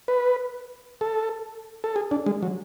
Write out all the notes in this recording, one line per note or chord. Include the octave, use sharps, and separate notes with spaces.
B4
A4
A4
G#4
D4
G#3
F#3